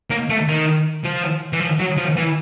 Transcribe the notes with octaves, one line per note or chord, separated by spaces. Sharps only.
A#3
A3
D#3
F3
E3
F3
F#3
F3
E3